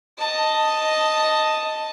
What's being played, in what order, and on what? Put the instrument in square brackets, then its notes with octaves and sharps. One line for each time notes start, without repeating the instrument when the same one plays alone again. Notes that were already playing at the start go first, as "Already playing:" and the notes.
[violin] D#5 A5